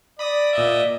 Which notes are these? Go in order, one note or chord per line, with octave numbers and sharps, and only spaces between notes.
D5 B5 D#6 A#6
A#2 D#5 E5